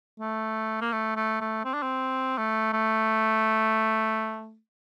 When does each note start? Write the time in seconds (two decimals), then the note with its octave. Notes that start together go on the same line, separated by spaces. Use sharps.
0.20 A3
0.81 A#3
0.92 A3
1.16 A3
1.41 A3
1.65 C4
1.74 D4
1.83 C4
2.38 A3
2.73 A3